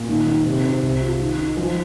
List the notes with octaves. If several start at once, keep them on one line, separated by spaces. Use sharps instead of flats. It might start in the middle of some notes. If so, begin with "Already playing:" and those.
Already playing: A#2
D#3
D#3
C3
C4
C2
F4
D#3
D#4
F3